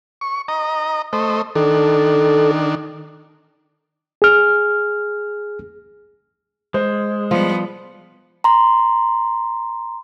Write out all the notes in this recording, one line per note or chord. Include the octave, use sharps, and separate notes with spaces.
C#6
D#5 A#5
A3 C5 D#5
D#3 D4 A4
G#4 F6
G#3 C5
F3 G3 B3
A#5 C6